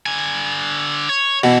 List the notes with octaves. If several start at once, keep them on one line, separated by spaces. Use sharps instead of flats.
D3 G#5
C#5
B2 E3